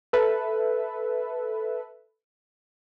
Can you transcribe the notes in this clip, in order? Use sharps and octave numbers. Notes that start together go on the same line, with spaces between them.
A4 B4 E5